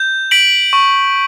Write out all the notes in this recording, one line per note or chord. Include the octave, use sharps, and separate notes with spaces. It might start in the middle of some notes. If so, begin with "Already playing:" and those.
Already playing: G6
B6 D7 F#7
C#6